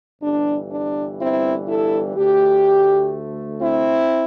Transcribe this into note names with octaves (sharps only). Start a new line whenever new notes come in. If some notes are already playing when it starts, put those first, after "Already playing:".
G1 G2 E3 G3 D4
D4
C4 E4
E4 A4
D2 D3 A3 D4 G4
C4 E4